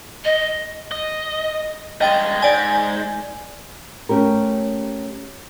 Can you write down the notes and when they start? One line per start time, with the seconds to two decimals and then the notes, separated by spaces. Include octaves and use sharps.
0.24 D#5
0.91 D#5
2.01 G2 G#3 D#5 G5 A6
2.42 G#2 D5 G#5
4.09 A3 C#4 G4 A#4